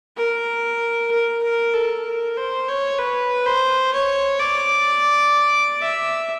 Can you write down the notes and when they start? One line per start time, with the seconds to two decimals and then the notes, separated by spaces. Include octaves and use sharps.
0.17 A#4
1.11 A#4
1.43 A#4
1.74 A4
2.05 A#4
2.37 C5
2.68 C#5
2.99 B4
3.46 C5
3.93 C#5
4.40 D5
5.81 E5